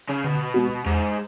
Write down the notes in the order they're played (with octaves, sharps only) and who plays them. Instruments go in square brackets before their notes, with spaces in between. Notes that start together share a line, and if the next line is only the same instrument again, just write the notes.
[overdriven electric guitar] C#3
[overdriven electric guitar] B2 [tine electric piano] D3
[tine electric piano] G#3 B3 F#4
[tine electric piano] E2 [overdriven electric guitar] G#2